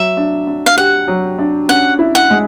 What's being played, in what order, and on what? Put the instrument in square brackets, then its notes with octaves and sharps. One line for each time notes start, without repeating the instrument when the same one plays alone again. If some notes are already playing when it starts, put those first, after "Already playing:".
Already playing: [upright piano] F#3 [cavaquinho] E5
[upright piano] D4
D4
[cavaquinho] F5
[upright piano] G4 [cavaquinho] F#5
[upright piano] F#3
D4
[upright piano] C#4 [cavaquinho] F#5
[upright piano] E4
[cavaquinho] F#5
[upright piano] G#3